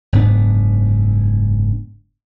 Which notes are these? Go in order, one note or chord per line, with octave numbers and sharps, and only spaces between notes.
F#1 G#2 B3 D4